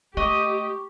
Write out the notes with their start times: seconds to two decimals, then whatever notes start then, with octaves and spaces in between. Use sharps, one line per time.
0.17 A3 G4 D#5 C#6 D6